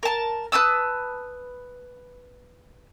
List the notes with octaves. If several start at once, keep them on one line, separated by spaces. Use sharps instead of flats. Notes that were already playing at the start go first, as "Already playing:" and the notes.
A#4 A5
B4 A5 D#6 E6